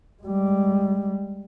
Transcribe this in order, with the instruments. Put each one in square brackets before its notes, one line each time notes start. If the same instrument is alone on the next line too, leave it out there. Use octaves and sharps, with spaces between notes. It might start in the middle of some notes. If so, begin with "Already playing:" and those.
[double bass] G3 G#3